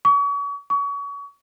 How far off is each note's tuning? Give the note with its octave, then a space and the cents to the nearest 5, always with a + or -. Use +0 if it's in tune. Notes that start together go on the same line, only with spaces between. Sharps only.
C#6 +40
C#6 +35